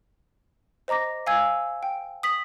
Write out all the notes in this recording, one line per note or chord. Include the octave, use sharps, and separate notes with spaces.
C5 D#5 A#5 D6 A#6
F5 G#5 E6 G#6
G5
D#6 B6 F#7